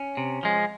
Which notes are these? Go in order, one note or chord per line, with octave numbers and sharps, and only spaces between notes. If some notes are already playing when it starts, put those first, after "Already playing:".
Already playing: C#4
C3
F3 G#3